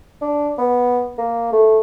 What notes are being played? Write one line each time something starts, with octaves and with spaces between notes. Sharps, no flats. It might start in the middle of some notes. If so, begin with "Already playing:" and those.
D4
B3
A#3
A3